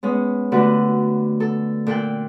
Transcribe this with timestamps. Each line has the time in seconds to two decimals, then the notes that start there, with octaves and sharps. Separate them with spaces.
0.03 G#3 B3 C#4
0.52 D3 A3 D4 F#4 G4 B4
1.40 A4
1.87 A#2 A4 G5 F#6